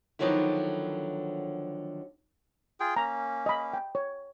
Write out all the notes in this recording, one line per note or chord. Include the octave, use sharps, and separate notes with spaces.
D3 D#3 F3 F#3 B3 E4
F4 G#4 G5
A#3 C#4 A#5
D#5 B5
G5
C#5